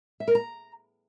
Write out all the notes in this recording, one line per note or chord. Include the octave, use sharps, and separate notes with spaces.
E5
A#4
A#5